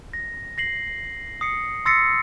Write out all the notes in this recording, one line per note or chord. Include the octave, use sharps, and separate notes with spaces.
A#6
A#6 C7 F#7
D#6 C7 C#7
C6 E6 A6 A#6 C7 C#7